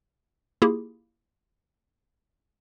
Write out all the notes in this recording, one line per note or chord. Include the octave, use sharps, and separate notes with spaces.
A#3 E4 F4 G4 G#4